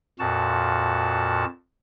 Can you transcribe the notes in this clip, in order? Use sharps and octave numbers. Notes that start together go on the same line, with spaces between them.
F2 A#2 F#4 A5